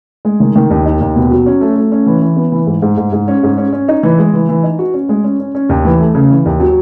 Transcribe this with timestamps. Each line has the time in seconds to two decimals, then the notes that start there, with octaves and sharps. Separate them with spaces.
0.25 G#3
0.40 D#3
0.55 D#3
0.70 D#2
0.86 D#4
1.01 D#2
1.16 B2
1.31 F#3
1.46 C#4
1.61 A3
1.76 A3
1.92 C#4
2.06 E3
2.22 E3
2.37 B3
2.52 E3
2.67 G#2
2.82 G#2
2.98 G#2
3.13 G#2
3.28 C#4
3.43 G#2
3.58 C#4
3.73 C#4
3.88 D#4
4.03 E3
4.18 G#3
4.34 E3
4.49 E3
4.63 D#4
4.79 F#4
4.94 C#4
5.09 G#3
5.24 C#4
5.40 C#4
5.55 C#4
5.69 D#2
5.85 E3
6.00 A3
6.15 C#3
6.30 E3
6.45 D#2
6.60 F#3